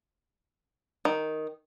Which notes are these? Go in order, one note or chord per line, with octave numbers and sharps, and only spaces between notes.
D#3